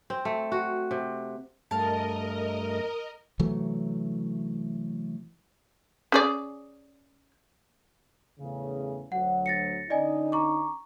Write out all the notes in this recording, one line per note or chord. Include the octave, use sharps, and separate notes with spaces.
C4
A3
F#4
C3
G2 A3 A#4 D#5 F5 A5
C3 E3 F#3 A3
C#4 G#4 D5
E2 A2 C#3
D2 F#3 F#5
A6 A#6 C#7
D3 C#4 D#4 D5 D#5 G#5
A#5 C#6 D6